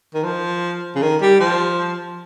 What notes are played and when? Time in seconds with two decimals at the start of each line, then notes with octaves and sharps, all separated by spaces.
0.14 D#3
0.24 F3
0.95 C#3
1.02 D#3
1.22 G3
1.40 F3